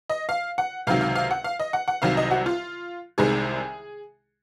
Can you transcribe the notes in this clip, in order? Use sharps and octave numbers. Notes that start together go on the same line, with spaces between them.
D#5
F5
F#5
C#2 C3 D#3 F#3 F5
F5
F5
F#5
F5
D#5
F#5
F#5
C2 C3 D#3 F#3 F5
D#5
F#4
F4
C2 C3 D#3 G#3 G#4